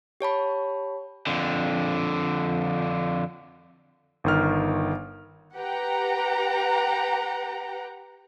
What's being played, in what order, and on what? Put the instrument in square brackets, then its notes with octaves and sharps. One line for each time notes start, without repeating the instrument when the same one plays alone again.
[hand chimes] G4 C#5 A5 B5
[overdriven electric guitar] F2 D3
[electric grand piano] G1 D#3 F6
[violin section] G4 B4 F#5 G5 A#5